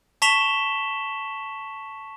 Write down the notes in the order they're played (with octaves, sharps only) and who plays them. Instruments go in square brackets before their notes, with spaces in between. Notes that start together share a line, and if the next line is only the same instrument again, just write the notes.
[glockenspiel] A5 C#6 B6 E7 F7 G7